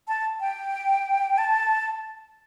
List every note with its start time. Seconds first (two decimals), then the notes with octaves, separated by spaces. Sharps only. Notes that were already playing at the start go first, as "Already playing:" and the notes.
0.08 A5
0.40 G5
1.38 A5